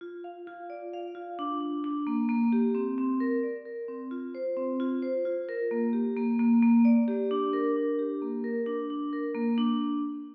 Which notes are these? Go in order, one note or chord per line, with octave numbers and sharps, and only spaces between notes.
F4
F5
F4
D5
F5
F4
D4
D4
D4
A#3
A#3
G4
C4
C4
A#4
D5
A#4
C4
F4
C5
C4
F4
C5
F4
A#4
A#3
G4
A#3
A#3
A#3
D5
G4
D4
A#4
D4
G4
A#3
A#4
D4
D4
A#4
A#3
D4